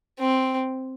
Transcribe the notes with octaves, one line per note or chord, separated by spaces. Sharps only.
C4